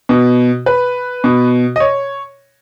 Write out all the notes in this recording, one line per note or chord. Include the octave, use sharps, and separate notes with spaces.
B2
B4
B2
D#5
C#5